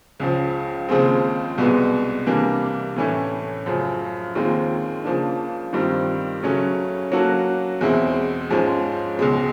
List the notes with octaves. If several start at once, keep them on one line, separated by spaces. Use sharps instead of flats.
C#2 C#3 F3
D#2 C#3 F3 G#3 C4
C2 B2 G#3 B3
C3 E3 G3 A#3 D4
A2 E3 A3 C#4 E4
F#2 C#3 F3
D#2 D#3 G#3 C4 F4
C#3 F3 A#3 D4
G2 D#3 G3 C4 F4
C#3 F#3 A3 C#4
F#3 A#3 C#4 F#4 A4
E2 B2 G#3 C4 E4
G#2 F3 G#3 C#4
C#2 B2 G#3